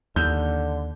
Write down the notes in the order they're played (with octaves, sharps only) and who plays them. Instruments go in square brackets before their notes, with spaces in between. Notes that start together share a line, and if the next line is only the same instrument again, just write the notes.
[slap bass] D#2 [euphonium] D3 [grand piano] G6